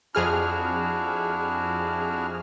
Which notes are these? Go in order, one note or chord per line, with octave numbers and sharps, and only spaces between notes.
F2 D4 E4 F#4 G#4 F6